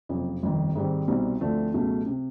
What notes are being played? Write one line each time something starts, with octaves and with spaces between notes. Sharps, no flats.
F#1 F2 C3 F3
G1 F2 C3 D#3
G#2 D#3 G3 C4
C2 B2 G3 C4 D#4
D2 D3 F3 A3 C4
C#2 B2 F#3 A3
C3